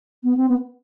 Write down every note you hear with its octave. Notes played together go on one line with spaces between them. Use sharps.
B3
C4
B3